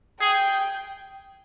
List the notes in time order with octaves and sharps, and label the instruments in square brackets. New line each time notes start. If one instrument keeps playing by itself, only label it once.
[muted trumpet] G#4 [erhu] G5